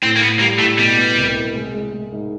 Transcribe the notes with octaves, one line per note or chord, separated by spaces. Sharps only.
A2 C4
A#3
A2 B3
G3 A#3
A2 A3
B2 G3
B3
C2
C2
G#3
G#3
G#3
G#2